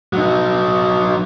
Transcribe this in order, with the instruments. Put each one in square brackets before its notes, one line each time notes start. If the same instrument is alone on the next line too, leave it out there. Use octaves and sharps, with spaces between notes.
[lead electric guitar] F#3 D#4